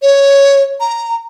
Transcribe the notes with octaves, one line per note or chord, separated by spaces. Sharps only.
C#5
A#5